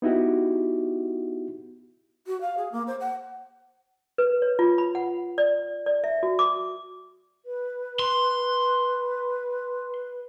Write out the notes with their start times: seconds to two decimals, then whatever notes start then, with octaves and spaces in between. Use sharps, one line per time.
0.02 B3 D#4 E4 F#4 G4
2.27 F#4
2.41 F5
2.58 G#4
2.72 A#3
2.87 C5
3.00 F#5
4.18 B4
4.42 C#5
4.59 F4
4.78 B5
4.95 F#5
5.38 D5
5.86 D5
6.04 E5
6.23 F#4
6.39 D6
7.45 B4
7.99 C6